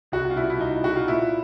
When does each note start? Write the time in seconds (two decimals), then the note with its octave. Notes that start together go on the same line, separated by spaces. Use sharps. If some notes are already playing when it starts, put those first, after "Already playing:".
0.12 C2 F#4
0.30 F4
0.36 B2 G3 E4
0.50 E4
0.60 C2 D#4
0.84 B2 G3 F#4
0.96 F4
1.08 A#2 E4